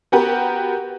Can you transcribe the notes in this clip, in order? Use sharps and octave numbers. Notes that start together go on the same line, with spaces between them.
B3 F#4 G4 A#4 B4